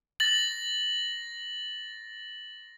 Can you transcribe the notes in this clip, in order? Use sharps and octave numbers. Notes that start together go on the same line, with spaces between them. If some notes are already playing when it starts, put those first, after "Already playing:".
A6 A#6 F#7